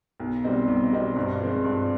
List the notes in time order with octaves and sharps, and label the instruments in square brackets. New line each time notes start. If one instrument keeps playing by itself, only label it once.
[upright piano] B1
B2 G3 C4 D#4
B1
B2 G3 C4 D#4
G2
F3 G#3 C4
G2